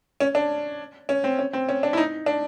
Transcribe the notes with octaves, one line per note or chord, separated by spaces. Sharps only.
C#4
D4
C#4
C4
C#4
C4
C#4
D4
E4
D#4
D4